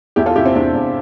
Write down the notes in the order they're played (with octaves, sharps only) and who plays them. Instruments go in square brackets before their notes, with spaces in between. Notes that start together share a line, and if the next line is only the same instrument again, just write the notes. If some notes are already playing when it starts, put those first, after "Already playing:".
[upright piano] E2 E4 G4
F4 A4
C3 E4 G4
C4
E2 D4
E2